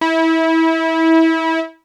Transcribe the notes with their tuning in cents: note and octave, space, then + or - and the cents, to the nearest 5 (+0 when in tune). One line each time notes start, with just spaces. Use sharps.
E4 -25